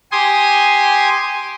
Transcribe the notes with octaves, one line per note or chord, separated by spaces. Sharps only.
G4 G#5 C6 D#6